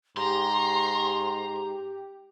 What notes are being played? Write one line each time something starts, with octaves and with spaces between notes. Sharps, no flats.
G#2 G4 A#5 C6